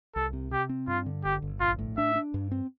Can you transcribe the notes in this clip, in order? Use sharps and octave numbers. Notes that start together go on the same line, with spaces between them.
C2 A4
C3
C3 G4
C4
G2 F4
D3
G1 G4
G1
A#1 F4
A2
D4 E5
D4
G2
C4